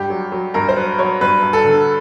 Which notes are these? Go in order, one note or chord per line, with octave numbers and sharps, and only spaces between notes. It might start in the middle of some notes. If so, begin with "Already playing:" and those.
Already playing: G2 G4
F#3
F#3
G2 A#4
C5
F#3 B4
F#3 C#5
G2 B4
G2
A4
D3